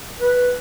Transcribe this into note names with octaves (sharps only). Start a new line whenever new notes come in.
B4